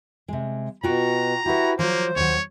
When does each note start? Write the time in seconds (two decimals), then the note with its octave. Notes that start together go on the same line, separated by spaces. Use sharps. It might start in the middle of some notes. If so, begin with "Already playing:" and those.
0.28 C3 G#3
0.83 B2 F4 F#4 G5 A#5
1.46 E4 F#4 G4 B4
1.79 F3 F#3 A#3 C5 C#5
2.16 D#2 F#3 C#5